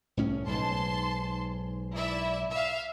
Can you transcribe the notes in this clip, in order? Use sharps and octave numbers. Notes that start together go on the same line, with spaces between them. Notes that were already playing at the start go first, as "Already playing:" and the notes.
C2 A2 C#4
B1 G#2 A5 C6
E4 D5 E5
E5 F5